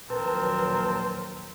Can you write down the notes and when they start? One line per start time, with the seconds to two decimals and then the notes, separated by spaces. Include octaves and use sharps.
0.10 A#1 D#2 F#3 C4 A#4 B4 A5